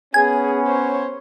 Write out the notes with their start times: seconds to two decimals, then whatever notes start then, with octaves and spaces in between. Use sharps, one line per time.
0.14 B3 C#4 G#4 G#5
0.67 C5 C#5